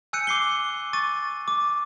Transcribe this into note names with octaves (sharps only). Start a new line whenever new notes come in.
G#5 E6 F#6 G6 C#7 D#7
D6 C7 G7
C#6 D6 A6 D#7
D6